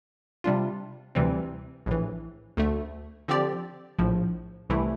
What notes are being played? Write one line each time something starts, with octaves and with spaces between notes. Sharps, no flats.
C3 G3 D4 F4
D2 C3 E3 G3 C4
A#1 A2 E3
D2 D3 A3
D3 F3 C4 G4 D5
A#1 A2 F3
C2 C3 E3 A3 E4